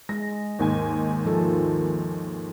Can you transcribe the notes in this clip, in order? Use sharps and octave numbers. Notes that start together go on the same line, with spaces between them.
G#3 A#6
D#2 G#2 G#5
D#3 F3 A4